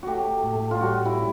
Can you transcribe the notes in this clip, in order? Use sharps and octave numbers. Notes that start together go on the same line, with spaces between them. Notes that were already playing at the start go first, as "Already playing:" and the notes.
A3 F#4 G4
A2
F4
G3 F#4
E4